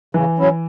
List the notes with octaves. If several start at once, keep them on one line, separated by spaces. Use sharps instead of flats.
C#3 E3
F#3 C#4 E4